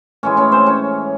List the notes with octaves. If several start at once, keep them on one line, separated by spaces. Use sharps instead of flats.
A2 E3 G#3 C#4 C#5
C#4 C#5
C4 C5
C#4 C#5